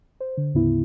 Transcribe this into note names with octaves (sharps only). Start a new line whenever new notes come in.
C5
D3
D2 G#2 C#3 B3 E4